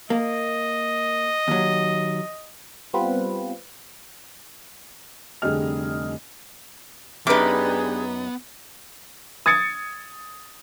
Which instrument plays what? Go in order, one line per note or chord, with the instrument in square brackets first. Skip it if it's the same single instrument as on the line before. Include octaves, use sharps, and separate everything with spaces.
[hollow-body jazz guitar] A#3 [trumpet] D#5
[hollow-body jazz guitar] D#2 F#3
[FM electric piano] G3 B3 C4 F4 B4
[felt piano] F1 D3 G3 G#4 D#5 F6
[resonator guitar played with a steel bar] F#2 B4 [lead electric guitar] B3 [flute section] D4 G4 G#4 [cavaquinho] D#4 D6
[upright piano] D#6 G#6 A6 C#7